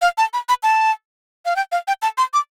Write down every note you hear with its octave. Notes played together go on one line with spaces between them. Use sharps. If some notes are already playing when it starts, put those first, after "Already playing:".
F5
A5
B5
B5
A5
F5
G5
F5
G5
A5
C6
D6